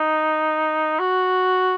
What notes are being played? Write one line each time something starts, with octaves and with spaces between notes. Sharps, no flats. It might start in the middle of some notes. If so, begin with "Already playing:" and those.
Already playing: D#4
F#4